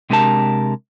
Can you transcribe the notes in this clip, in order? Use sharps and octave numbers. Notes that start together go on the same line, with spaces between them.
C3 G#3 D4 G4 A#4 A5